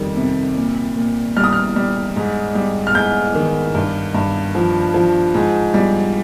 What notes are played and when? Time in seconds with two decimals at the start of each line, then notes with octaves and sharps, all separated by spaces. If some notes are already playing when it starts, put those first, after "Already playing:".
Already playing: F2 D#3 G3
0.17 C3
0.56 A#2
0.97 A#2
1.37 G3 F6
1.44 D#6
1.53 F6
1.76 G3
2.16 G#2
2.55 G3
2.87 F6
2.95 G#2 G6
3.35 D#3
3.75 G2
4.14 G2
4.55 F3
4.94 F3
5.34 G#2
5.74 G3